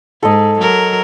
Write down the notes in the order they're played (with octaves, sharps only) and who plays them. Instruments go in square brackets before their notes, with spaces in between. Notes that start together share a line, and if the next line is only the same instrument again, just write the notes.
[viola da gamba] G#2 [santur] A4 D#5
[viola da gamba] F#3 A#4